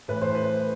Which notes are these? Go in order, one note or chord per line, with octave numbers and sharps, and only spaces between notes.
A2 E3 B4
C5
B4